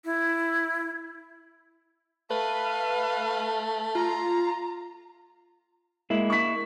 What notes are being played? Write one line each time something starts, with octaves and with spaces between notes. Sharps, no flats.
E4
A3 B4 F5
F4 A#5
G#3 A#3 E4
C#6 B6